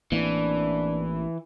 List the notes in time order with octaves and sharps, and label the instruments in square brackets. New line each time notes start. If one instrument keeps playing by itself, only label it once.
[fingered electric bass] A1 A#3 C4 [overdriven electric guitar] E3 [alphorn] D4